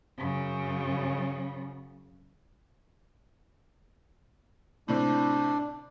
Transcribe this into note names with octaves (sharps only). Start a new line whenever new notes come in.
F#2 C#3
A2 C3 C4 D4